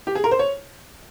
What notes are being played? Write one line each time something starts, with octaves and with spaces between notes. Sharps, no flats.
G4
G#4
A#4
C5
C#5